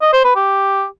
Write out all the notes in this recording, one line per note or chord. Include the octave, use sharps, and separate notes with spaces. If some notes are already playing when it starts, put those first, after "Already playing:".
D#5
C5
B4
G4